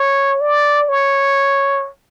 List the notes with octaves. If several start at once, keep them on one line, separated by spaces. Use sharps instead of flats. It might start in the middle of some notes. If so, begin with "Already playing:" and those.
Already playing: C#5
D5
C#5